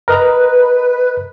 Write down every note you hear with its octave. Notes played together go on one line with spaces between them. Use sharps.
A#4 B4 D#5 A#5